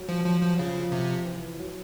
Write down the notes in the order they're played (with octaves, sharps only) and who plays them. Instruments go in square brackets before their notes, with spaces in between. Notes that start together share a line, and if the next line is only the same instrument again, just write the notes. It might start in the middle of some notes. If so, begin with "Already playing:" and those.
Already playing: [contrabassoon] F#3
[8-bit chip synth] F3
F3
F3
[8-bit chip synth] C#3 [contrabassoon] F3
[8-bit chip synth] C3
[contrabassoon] E3
F#3